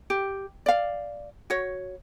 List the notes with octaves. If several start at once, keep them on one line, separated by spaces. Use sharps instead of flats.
G4
D5 F5
F#4 C#5